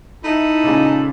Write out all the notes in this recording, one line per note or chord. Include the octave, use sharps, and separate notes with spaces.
D#4 E4 A4 B5
A#2 C#3 G#3